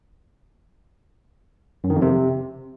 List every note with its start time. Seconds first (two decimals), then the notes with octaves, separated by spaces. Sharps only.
1.84 F#2
1.90 D#3
1.96 F2
2.02 C3